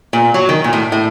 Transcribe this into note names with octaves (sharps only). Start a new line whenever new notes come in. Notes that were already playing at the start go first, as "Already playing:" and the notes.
A#2
F#3
D#3
A#2
A2
A2